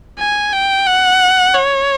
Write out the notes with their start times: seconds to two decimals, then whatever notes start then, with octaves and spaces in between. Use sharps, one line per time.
0.19 G#5
0.53 G5
0.87 F#5
1.54 C#5